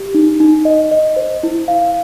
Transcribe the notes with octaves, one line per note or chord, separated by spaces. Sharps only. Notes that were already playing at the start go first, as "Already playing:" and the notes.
Already playing: G4
D#4
D#4
D#5
D#5
C5
E4
F5